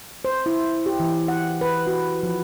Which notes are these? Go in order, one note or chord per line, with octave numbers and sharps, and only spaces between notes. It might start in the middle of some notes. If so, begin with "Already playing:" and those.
C5
E4
G4
E3
F#5
B4
F#4
F3